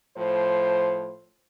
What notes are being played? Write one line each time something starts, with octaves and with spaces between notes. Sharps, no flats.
A2 F3 C5